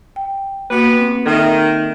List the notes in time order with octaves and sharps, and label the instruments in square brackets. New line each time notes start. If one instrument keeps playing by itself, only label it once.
[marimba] G5
[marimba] A#3 F#4 [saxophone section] B3 G4 B4
[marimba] C4
[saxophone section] D#3 [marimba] A4 E5